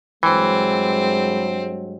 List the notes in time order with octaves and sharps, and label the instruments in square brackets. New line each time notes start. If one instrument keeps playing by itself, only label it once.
[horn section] G2 F#3 G#3 [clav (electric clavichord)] E3 [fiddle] C4